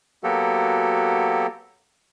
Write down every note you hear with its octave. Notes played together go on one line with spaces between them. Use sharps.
F#3 A#3 B3 F#4 G4 A4